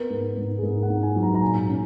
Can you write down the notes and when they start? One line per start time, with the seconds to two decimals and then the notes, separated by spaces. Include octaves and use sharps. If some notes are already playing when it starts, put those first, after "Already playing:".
Already playing: B3 A#4
0.10 G#2
0.37 G#2
0.58 G#4
0.63 G#2 A#4
0.83 F#5
0.90 G#2
1.02 G#5
1.16 F#3
1.23 A#5
1.35 A#5
1.42 A#2 G#5
1.68 C#4